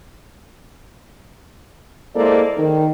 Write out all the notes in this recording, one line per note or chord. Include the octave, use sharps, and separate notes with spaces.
G#3 A#3 E4 A4 C5 D5
D#3